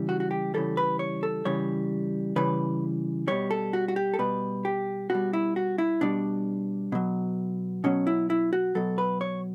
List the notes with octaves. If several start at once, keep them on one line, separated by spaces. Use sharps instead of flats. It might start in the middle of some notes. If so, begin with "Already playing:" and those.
Already playing: C#3 E3 G3
F#4
F#4
G4
C#3 E3 G3 A4
B4
C#5
A4
C#3 E3 G3 C#5
C#3 E3 G3 B4
B2 G3 C#5
A4
F#4
F#4
G4
A4
B2 G3 B4
G4
B2 G3 F#4
E4
F#4
E4
B2 G3 D4
B2 F#3
B2 F#3 C#4
E4
E4
F#4
B2 F#3 A4
B4
C#5